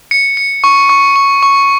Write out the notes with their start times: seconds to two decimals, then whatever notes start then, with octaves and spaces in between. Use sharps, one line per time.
0.11 C#7
0.37 C#7
0.64 C#6
0.89 C#6
1.16 C#6
1.43 C#6